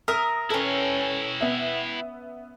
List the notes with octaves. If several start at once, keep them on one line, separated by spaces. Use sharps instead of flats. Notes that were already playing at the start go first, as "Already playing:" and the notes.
A#4 E5 D#6
C#4 E4 A4 B4 G5
B3 E5